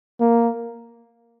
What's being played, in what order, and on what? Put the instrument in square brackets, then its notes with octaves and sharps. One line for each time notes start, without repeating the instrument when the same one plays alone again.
[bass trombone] A#3